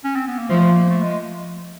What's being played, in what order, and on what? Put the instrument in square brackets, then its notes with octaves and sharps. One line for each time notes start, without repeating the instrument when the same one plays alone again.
[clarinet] C#4
C4
B3
A#3
[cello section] F3 [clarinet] A3
[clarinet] A#3
A3
G#3